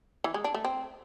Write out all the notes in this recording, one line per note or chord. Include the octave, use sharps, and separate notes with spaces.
E3
G#3
D4
A3
C4